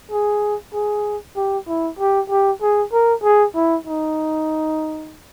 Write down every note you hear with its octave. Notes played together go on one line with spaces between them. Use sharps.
G#4
G#4
G4
E4
G4
G4
G#4
A#4
G#4
E4
D#4